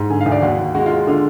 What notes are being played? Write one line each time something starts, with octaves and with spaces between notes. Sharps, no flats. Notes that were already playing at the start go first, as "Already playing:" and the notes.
Already playing: G#2
D3 G#5
F5
D2
D5
D#2 F#4
D#2
G#3 F#4
G#3 F4
D3 F4